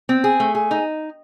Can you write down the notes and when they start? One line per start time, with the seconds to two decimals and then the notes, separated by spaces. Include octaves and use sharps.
0.09 C4
0.24 G#4
0.40 A3
0.55 G#4
0.71 D#4